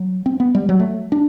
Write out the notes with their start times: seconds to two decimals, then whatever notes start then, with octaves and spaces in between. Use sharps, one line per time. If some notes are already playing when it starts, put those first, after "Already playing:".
Already playing: F#3
0.26 C4
0.40 B3
0.55 G3
0.69 F#3
0.80 A3
1.12 D4